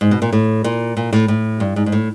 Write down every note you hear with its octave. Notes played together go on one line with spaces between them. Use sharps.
G#2
B2
A#2
A2
A#2
A#2
A2
A2
G2
G#2
G#2
A2